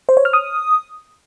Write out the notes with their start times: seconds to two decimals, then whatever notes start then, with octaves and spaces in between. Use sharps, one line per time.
0.09 C5
0.17 C#5
0.25 F6
0.33 D#6